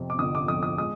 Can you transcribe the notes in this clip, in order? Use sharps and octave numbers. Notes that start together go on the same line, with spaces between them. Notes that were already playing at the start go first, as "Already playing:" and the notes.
Already playing: F2 C3
D6
G1 D#6
D6
F2 D#6
D#6
G#3 D#6